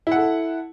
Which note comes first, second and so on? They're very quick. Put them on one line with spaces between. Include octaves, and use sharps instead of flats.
E4 F#5 A4